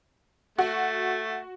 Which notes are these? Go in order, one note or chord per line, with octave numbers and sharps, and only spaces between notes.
A3 F#4